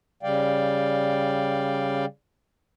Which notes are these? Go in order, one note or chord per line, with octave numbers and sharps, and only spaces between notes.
C#3 G3 D5 F5 G5